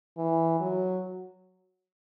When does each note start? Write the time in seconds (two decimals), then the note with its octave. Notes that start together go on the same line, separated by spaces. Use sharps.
0.18 E3
0.60 F#3